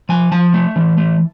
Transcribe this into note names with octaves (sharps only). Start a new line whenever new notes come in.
F3 G#5
F3 A5
A3
E3
A3